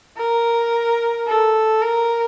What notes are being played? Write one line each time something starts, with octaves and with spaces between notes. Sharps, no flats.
A#4
A4
A#4